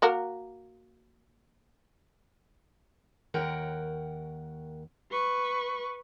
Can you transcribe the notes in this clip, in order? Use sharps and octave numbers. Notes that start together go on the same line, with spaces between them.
A#3 F#4 A#4
D#2 A#4 F#5 G5
B4 C#6